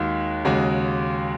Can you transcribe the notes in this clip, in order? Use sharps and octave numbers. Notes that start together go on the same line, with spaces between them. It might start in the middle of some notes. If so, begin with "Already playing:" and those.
Already playing: D#2 D#3 G#3 F#4
D#2 C#3 G#3 F#4